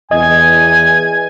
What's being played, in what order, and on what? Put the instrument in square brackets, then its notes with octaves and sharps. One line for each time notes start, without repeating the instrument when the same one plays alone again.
[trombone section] E2 [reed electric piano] D#5 [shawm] G#5 [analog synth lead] G#6